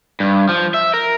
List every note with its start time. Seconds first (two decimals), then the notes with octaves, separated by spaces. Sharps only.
0.20 G2
0.49 F3
0.74 E5
0.94 A#4